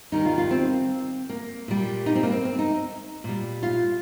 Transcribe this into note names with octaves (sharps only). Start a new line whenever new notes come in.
D#2 D#3 G3 D#4
F4
F4
C4
A#3
A#2 G3
D#4
C4
A#3
C4
C4
D#4
A#2 G3
F4